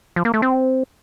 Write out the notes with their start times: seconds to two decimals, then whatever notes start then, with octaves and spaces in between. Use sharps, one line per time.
0.16 F3
0.25 A#3
0.34 A3
0.42 C4